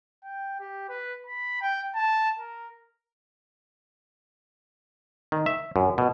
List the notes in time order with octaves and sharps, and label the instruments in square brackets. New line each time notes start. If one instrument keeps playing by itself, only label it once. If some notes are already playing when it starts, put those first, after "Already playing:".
[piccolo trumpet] G5
G4
B4
B5
G5
A5
A#4
[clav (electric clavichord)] D#3
E5
F#2
B2